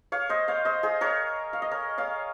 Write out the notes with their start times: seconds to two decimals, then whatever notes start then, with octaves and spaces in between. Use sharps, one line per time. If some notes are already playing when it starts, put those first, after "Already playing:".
0.12 C#5 F5
0.29 C5 D#5
0.48 C#5 F5
0.65 C5 D#5
0.83 G#4 C5
1.01 A#4 C#5
1.53 F5
1.62 D#5
1.71 A#4 C#5
1.98 C#5 F5